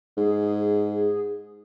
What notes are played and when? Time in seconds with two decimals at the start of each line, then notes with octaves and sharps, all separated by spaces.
0.17 G#2 G#4